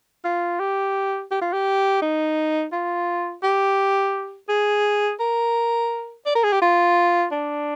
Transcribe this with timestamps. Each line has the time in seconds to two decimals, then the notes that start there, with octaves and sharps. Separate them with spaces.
0.25 F4
0.60 G4
1.31 G4
1.42 F4
1.53 G4
2.02 D#4
2.72 F4
3.43 G4
4.49 G#4
5.20 A#4
6.26 D5
6.35 A#4
6.43 G#4
6.53 G4
6.62 F4
7.32 D4